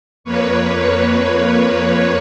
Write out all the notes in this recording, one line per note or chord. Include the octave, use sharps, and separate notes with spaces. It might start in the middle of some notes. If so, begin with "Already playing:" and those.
F2 A#3 B4 C#5